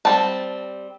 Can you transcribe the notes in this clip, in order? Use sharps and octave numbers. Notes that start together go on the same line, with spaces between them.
G3 C4 A5